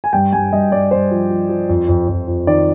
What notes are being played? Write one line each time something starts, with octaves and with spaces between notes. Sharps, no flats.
G#5
G2 G5
G2 G#5
G2 D#5
G2 D5
G2 C5
F3
F3
F3
F2
F2
F2
F2
D#3 D5